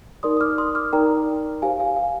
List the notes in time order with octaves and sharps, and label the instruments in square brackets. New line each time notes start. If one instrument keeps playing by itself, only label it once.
[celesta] D#4 A#4 D5 C6 D#6
D#6
D6 F6
C6 D#6
D6 F6
D#4 A#4 D5 G5 A#5
G4 C5 F5 G#5
F5 G#5
F5